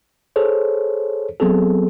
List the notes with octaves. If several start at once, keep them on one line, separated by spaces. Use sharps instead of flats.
G#4 A4 C5 C#5
F#3 B3 C4 G#4 A4